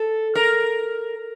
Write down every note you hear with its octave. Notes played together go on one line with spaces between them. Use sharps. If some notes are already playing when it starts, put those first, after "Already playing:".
Already playing: A4
A#4